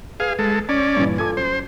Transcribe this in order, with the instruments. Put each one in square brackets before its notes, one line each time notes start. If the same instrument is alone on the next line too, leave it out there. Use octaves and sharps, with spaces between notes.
[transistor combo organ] G#4 F5 [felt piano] B4
[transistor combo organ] G#3 A4
C#4 D5
[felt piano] G2 A#2 E3
[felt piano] F4 A4 D6 [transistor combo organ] G#5
[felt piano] F#2 [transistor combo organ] C5